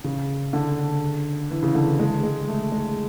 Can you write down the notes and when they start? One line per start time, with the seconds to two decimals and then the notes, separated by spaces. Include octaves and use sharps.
0.04 C#3
0.53 D3
1.51 E3
1.63 C#3
1.75 D3
1.87 E3
1.99 G#3
2.23 G#3
2.48 A3
2.72 G#3